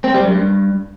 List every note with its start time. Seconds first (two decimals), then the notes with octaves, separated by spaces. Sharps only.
0.04 C4
0.14 G3
0.25 F#2
0.35 G2